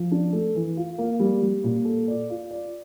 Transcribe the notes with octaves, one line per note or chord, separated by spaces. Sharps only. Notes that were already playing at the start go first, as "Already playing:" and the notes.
Already playing: F3
D4
A3
E3
F4
A#3
G3
G3
A#2
A4
D5
F4
D5